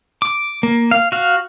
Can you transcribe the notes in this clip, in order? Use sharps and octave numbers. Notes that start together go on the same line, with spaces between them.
D6
A#3
F5
F#4 F5